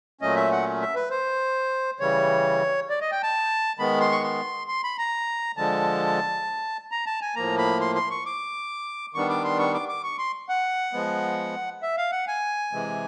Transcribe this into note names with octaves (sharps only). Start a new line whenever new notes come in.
A#2 F#3 A3 C#4 D#5
E5
F#5
E5
B4
C5
C#3 E3 G3 C#5
D5
D#5
G5
A5
D#3 G#3 B3 B5
C6
C#6
C6
C6
B5
A#5
D3 F3 G#3 A5
A#5
A5
G#5
A2 F3 A#3 A#5
B5
C6
C6
C#6
D6
D#3 G3 B3 D4 C#6
D6
C6
C#6
D6
D6
C#6
C6
F#5
F3 G#3 B3
E5
F5
F#5
G#5
C3 E3 G#3